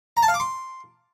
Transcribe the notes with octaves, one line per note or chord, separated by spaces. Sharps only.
A#5
A5
F5
D6
C6